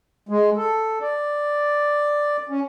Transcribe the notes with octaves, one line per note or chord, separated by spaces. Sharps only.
G#3
A4
D5
C#4